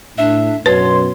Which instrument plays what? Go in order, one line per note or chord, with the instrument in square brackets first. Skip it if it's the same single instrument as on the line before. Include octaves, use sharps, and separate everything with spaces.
[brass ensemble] A2 [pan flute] D4 [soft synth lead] E5
[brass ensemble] F#2 B2 [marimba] B4 [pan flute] C#5 [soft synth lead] C6